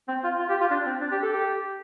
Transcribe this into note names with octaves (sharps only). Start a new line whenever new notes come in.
C4
F4
F4
G4
F4
D4
C4
D4
G4
A4
G4